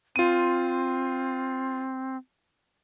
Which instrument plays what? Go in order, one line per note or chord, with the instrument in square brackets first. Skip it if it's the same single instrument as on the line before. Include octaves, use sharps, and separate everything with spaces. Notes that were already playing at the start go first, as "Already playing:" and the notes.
[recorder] C4 [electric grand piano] F4 D#7